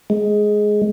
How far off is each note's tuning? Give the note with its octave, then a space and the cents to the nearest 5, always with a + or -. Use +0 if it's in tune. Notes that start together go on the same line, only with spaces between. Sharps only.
G#3 +10